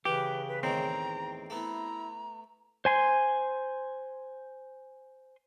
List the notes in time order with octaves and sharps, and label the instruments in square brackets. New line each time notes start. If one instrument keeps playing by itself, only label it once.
[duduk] C#3 [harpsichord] E3 [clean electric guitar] G4 [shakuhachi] B4
[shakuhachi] B4
[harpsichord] E2 A2 D#3 [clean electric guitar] C4 [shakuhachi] A#5
[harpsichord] A3 B3 [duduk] E4 [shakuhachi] A#5
[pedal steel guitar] C5 G#5 C6